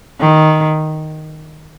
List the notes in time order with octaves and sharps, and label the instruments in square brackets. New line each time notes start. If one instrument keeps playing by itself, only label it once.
[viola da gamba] D#3